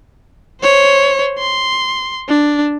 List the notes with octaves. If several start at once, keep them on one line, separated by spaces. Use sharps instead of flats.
C5 C#5
C6
D4